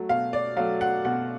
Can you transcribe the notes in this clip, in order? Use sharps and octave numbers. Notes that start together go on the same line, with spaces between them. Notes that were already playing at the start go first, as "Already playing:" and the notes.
Already playing: F#3 A3
B2 F5
D5
F#3 A3 F5
F#5
B2 F#5